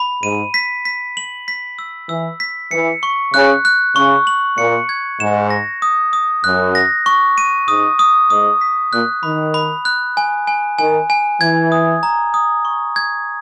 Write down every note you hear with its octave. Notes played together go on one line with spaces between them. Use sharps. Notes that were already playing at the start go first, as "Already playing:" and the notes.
Already playing: B5
G#2 D#7
B6
B6
F#7
B6
E6
E3 E6
B6
E3 C#7
C#6
C#3 F#6
F#6
C#3 C#6
F#7
A#2 C#7
G#6
G#2 E7
A#6
D#6
D#6
F#2 F#6
A#6
C#6
D#7
G#2 D#6
D#6
G#2 D#6
B6
A#2 F#6
D#3 B5
B5
F#6
G#5
G#5
D#3 G#5
G#5
E3 G#6
D#6
A#5
D#6
C#6
G#6